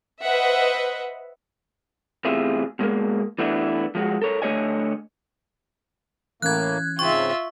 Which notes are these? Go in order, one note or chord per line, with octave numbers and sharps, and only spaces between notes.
B4 C5 D#5 E5 F#5
E2 A2 C3 F4 G#4 E5
B2 G#3 A#3
E3 A3 B3 D4 E4
F3 G#3 F#4
A4 A#4 C#5
D3 A3 A4 C#5 D#5 G#5
A2 E3 A#3 C#4 F#6 G#6
G#2 C#3 C4 F4 E5 C#6